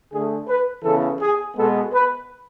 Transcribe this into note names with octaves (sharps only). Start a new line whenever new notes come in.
D3 A3 G#4
B4
C#3 E3 B3 A4
G#4
B2 G#3 B3 A4
B4